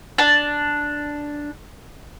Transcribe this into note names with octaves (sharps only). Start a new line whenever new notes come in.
D4 A5